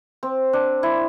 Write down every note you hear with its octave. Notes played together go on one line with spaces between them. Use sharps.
C4
D4
E4